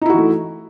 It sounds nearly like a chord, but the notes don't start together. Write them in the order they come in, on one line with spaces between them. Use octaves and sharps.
D#4 E4 F#4 E3 A3